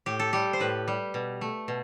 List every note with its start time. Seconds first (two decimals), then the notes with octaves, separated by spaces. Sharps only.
0.06 A2 G4
0.20 A4
0.33 G3 G4
0.53 C5
0.60 A2 B4
0.88 G3
1.14 B2
1.41 A3
1.68 B2